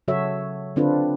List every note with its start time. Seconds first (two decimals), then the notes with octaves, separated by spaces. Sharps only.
0.08 C#3 F#3 F#4 A4 C#5 E5
0.76 D3 C4 D4 F4 A4 B4